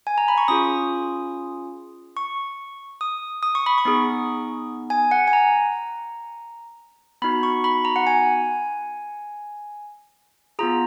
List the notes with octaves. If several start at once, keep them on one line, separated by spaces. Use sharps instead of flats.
G#5
A#5
B5
C#6
C#4 F4 G#4 D#6
C#6
D#6
D#6
C#6
B5
C#6
B3 D#4 G#4
G#5
F#5
G#5
A#5
B3 D#4 F#4 B5
C#6
B5
A#5
F#5
G#5
B3 F4 G#4 A#5